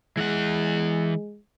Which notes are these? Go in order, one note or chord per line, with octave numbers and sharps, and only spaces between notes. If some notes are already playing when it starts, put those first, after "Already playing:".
E3 G#3 F#5